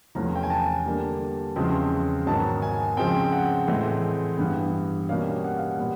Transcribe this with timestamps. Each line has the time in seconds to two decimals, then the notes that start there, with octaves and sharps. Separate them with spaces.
0.15 E2 C3 F3 A3 C#4 A#5
0.36 G5
0.43 G#5
0.50 A5
0.86 D3 G3 A#3
1.56 E2 C#3 F3 G#3 C4
2.26 G#2 D#3 F#3 B3 A5
2.62 G#5
2.97 C#3 F3 G#3 C4 G5
3.32 F#5
3.68 A2 E3 G#3 C4
4.37 G2 E3 G3 B3
5.09 B2 G3 A#3 C#4 F5
5.44 F#5
5.57 F5
5.71 F#5
5.79 A#2 G3 B3